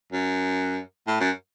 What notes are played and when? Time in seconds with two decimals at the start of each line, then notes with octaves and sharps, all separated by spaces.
0.12 F#2
1.07 A2
1.20 F#2